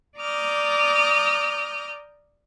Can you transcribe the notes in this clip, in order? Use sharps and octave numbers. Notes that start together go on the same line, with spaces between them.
D5 A#5 D6 D#6 F6 G6